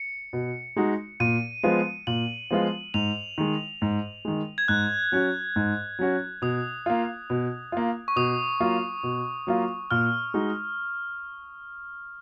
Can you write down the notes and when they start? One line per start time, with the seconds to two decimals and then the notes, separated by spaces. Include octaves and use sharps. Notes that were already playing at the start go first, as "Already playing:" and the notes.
Already playing: C#7
0.33 B2
0.76 G#3 D#4 F#4
1.20 A#2 D#7
1.63 F3 G#3 B3 F4
2.07 A#2 F#7
2.50 F3 G#3 B3 F4
2.94 G#2 F7
3.38 D#3 G#3
3.82 G#2
4.25 D#3 G#3
4.58 G#6
4.68 G#2 F#6
5.12 F#3 C#4 F#4
5.56 G#2
5.99 F#3 C#4 F#4
6.42 B2 D#6
6.86 A#3 F4
7.30 B2
7.72 A#3 F4
8.08 C#6
8.16 B2 D#6
8.60 F#3 A#3 F4
9.03 B2
9.47 F#3 A#3 F4
9.91 A#2 F6
10.34 G#3 D#4 F#4